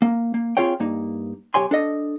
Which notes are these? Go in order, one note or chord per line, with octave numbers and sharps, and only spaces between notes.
A#3
A#3
C4 F4 G#4 C#5 G5
G2 A#3 D#4
B1 A#2 G4 C#5 G#5 C6
D4 A4 D#5